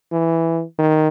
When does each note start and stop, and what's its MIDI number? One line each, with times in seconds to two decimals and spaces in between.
0.12 0.62 52
0.79 1.08 51